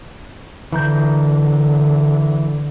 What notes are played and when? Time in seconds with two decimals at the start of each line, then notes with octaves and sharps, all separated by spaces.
0.73 D3 E3 A#5 G6